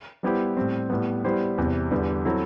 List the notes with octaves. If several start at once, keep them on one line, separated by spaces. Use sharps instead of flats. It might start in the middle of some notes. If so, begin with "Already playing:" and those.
G3 B3 E4 G4 C5
A2 G3 C4
A2 G3 B3
G3 B3 E4 G4 C5
E2 C3 G3 C4
E2 D3 G3 B3
F#3 C4 E4 A4